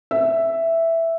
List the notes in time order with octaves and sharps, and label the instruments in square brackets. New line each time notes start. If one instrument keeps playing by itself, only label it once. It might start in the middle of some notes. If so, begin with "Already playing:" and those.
[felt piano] E5